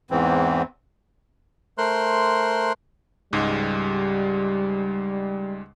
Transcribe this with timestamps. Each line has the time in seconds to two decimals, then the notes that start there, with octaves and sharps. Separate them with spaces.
0.11 E2 G#2 E3 C4
1.78 A3 A#4 C5 C6 F#6
3.33 C#2 G#2 G3 G#3